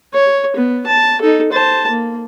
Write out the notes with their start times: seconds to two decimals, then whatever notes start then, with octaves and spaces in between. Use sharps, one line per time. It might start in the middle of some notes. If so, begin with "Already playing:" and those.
0.14 C#5
0.56 B3
0.86 A5
1.21 D#4 A4
1.52 C5 A5
1.89 A#3